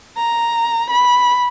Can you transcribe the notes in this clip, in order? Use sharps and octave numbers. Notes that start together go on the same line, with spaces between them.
A#5
B5